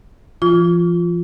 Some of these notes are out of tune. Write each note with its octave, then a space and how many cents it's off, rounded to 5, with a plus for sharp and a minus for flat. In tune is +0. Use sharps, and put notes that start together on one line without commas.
F3 -40 F4 +0 D6 -45